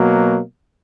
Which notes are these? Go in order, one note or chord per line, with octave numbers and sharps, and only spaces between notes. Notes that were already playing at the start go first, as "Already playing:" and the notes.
Already playing: B2 F#3 A#3